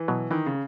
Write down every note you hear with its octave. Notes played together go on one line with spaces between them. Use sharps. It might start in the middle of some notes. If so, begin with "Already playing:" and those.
Already playing: E3
B2 F#3
D#3 E3
C#3